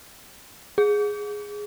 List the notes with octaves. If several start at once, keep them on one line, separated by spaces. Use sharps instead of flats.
G#4